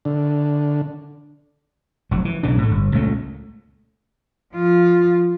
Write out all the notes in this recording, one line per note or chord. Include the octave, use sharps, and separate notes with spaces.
D3
F1 F#3
E3
B1 C#3 E3 D4
A2 A3
G1
C#2 A#2 A3
F3 F4